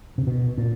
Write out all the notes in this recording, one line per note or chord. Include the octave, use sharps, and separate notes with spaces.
C3
B2
A#2